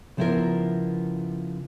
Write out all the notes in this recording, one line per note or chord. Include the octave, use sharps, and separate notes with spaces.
C#3 F3 B3 E4 F4 A#4